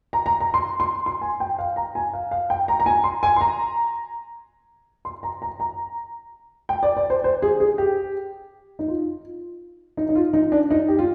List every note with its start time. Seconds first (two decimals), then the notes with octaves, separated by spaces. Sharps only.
0.13 A#5
0.26 A#5
0.40 A#5
0.54 C6
0.80 C6
1.06 C6
1.22 G#5
1.40 G5
1.59 F5
1.76 A#5
1.95 G#5
2.13 F5
2.31 F5
2.50 G5
2.68 A#5
2.80 A#5
2.86 G#5
3.04 C6
3.23 G#5
3.36 C6
3.41 A#5
5.05 C6
5.23 A#5
5.42 A#5
5.60 A#5
6.69 G5
6.83 D5
6.97 D5
7.10 C5
7.24 C5
7.42 G#4
7.60 G#4
7.78 G4
8.79 D#4
8.88 F4
9.97 D#4
10.09 D#4
10.15 F4
10.33 D#4
10.52 D4
10.71 D#4
10.88 G4
10.99 F4